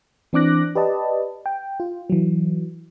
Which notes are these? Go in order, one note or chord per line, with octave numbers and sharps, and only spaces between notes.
E3 C4 D4 D6 F#6 A#6
G4 B4 D5 D#5 A5
G5
F4
E3 F#3